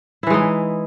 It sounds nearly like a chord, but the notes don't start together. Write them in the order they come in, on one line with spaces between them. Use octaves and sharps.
E4 E3 G#3 D#4